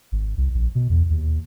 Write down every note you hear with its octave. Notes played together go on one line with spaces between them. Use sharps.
G#1
C2
A#1
B2
E2
D#2